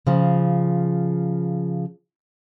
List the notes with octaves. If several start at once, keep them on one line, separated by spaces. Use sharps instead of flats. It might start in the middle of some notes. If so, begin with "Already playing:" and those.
C#3 F3